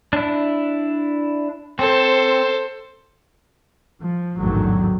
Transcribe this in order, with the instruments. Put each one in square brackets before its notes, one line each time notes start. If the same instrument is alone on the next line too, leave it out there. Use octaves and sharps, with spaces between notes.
[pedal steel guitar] D4 E4
[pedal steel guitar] C4 [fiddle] A4 C5
[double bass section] F3
A1 E2 G#2 D3 D#3 F#3